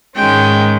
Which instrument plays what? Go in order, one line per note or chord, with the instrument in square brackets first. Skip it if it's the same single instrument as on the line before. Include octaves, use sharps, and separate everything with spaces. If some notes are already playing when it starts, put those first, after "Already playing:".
[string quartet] G#2 D#3 G#3 C#4 G5